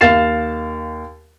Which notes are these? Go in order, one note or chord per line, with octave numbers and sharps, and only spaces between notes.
D#2 F5 A6 C7 E7